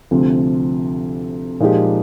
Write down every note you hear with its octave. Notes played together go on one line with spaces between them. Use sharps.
D2 C3 F3 C4
A#2 F3 G#3 D#4 G4